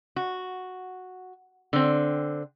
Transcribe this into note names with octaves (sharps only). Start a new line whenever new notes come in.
F#4
D3 C4